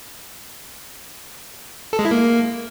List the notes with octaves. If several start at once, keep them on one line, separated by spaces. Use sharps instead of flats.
A4
G#3
E4
A#3